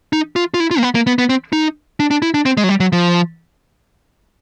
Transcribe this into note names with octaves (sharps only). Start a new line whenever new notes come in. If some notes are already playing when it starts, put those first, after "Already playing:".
D#4
F4
F4
E4
F4
A#3
B3
A#3
B3
B3
C4
D#4
D4
D4
E4
D4
C4
G#3
F#3
G3
F#3
F3